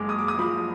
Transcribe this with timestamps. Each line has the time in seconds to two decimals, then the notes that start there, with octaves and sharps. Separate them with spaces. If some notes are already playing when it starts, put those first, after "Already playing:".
Already playing: F#1 G#3 D6
0.09 D#6
0.18 D6
0.28 D#6
0.38 F3 B5